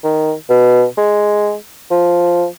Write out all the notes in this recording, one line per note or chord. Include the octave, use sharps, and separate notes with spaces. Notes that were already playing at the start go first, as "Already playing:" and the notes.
D#3
B2
G#3
F3